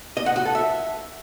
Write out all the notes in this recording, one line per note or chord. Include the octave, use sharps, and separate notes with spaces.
D#5
F#5
F#4
A4
E5